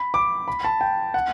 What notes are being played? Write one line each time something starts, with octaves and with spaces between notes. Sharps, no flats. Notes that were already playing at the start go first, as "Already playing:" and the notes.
Already playing: B5
D6
B5
A5
G5
F#5